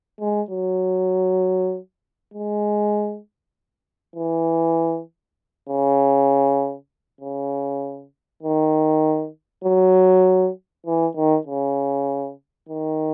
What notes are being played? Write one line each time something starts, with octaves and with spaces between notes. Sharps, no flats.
G#3
F#3
G#3
E3
C#3
C#3
D#3
F#3
E3
D#3
C#3
D#3